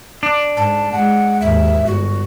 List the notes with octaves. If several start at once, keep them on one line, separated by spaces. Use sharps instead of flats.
D4
G#2 A5
G#3 F#5
D#2 G#2 E5
G1 F#4